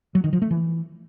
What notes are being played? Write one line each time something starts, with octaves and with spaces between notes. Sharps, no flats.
F#3
D#3
F3
A3
E3